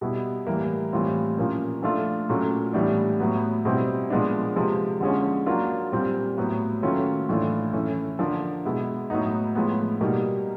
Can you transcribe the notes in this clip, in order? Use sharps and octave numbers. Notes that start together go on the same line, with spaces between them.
B2 G3 B3 E4
A2 E3 G3 A#3
A2 E3 G3 C4 F4
A#2 F3 A#3 C#4
F3 A3 D4 F4
A#2 F#3 A3 C#4
A2 E3 G3 B3 D4
A2 F#3 B3
B2 G3 C4 E4
A#2 F3 G#3 B3 D4
C3 F3 G#3
D3 F3 G#3 C#4
F#3 A#3 D4 F4
A#2 G3 C4
A2 F#3 B3
D#3 F#3 A3 C#4 F4
A2 E3 A3 D4 F4
A2 E3 A3 C#4
D3 F3 A#3 D4
B2 G#3 B3 E4
A2 F#3 B3 D#4
A2 F3 G#3 B3
B2 G3 A#3 D#4